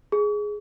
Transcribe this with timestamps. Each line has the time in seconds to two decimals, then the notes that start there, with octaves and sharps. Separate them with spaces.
0.12 G#4